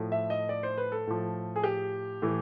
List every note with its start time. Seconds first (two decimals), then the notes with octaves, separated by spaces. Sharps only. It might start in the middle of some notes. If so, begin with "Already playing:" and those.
Already playing: A2 F3
0.12 E5
0.30 D#5
0.49 D5
0.63 C5
0.78 B4
0.92 A4
1.07 A2 F3
1.56 G#4
1.64 G4
2.22 A2 E3